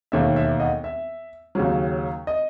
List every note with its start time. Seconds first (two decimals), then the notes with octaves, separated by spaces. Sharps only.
0.12 E1 D#2 D#3 A3 E5
0.36 E5
0.60 D#5 F#5
0.84 E5
1.55 D#2 C#3 F#3
2.27 D#5